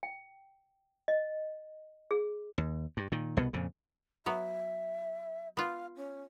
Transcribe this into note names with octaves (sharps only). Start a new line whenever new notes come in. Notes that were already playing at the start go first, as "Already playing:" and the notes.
G5
D#5
G#4
D#2
G2
A#2 D#3
C2 B2 B3
F2 A#2 C#3
F#3 B3 E5
B3 F4 F5
C#4